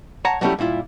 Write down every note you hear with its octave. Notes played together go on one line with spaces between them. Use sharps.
C#5 F#5 A5 A#5
F#3 G3 A3 C#4 E4 G4
A#2 G3 E4 F4